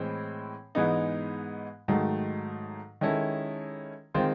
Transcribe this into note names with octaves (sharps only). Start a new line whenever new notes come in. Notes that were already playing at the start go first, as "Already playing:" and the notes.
Already playing: A2 E3 G#3 C4
G#2 E3 G#3 B3 D#4
G#2 D#3 F#3 A3
D#3 G#3 C#4 E4 A4
D#3 G#3 C4 F4